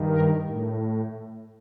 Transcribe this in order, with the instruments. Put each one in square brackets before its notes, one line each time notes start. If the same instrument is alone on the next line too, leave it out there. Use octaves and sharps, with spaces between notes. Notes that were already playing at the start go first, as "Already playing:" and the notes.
Already playing: [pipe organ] G2 D#3
A#4
A2